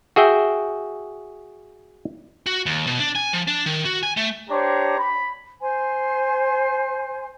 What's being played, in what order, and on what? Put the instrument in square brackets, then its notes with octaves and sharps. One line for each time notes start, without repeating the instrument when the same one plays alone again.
[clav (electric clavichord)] F#4 G#4 E5 G5
[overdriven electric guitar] F#4
D#2
B2
D4
G#5
F3
D4
D#3
F#4
G#5
A3
[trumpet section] D4 G4 C5 C#5 A#5
B5
[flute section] C5 G#5 C6